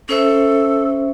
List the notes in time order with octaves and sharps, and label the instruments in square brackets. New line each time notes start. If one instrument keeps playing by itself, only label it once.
[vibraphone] C#4 C5 E5 [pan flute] A4